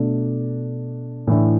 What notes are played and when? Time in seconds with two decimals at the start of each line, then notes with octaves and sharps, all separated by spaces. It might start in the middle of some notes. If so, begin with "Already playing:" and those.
Already playing: B2 A3 D4
1.27 A2 E3 D4